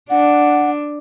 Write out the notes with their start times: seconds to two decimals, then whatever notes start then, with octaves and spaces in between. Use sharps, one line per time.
0.10 D4 F#5